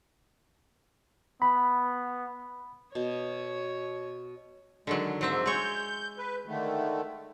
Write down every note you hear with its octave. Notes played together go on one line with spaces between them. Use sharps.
B3 B5
B2 C#5
D3 D#3 F#3 G#3
G#2 F#3 C4 E5
G#3 C#5 G6
B4
D3 D#3 A3